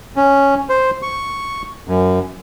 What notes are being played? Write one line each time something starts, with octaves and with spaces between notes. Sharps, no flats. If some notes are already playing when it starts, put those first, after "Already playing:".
C#4
C5
C#6
F#2